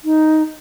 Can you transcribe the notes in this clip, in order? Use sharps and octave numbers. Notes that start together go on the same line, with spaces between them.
D#4